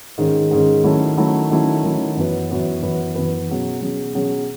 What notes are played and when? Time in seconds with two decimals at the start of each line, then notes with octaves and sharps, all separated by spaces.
0.18 G#2 D#3 G#3 C#4
0.51 G#2 D#3 G#3 C#4
0.84 D#3 F#3 A3 C#4 E4
1.17 D#3 F#3 A3 C#4 E4
1.51 D#3 F#3 A3 C#4 E4
1.83 D#3 F#3 A3 C#4 E4
2.16 F#2 E3 B3 F#4 B4
2.50 F#2 E3 B3 F#4 B4
2.82 F#2 E3 B3 F#4 B4
3.15 F#2 E3 B3 F#4 B4
3.49 B2 F#3 C#4 G#4
3.82 B2 F#3 C#4 G#4
4.15 B2 F#3 C#4 G#4